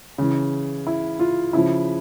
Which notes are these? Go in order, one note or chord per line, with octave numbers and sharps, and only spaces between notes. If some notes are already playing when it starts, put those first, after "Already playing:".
C#3 E3
E4
F4
C#3 F3 E4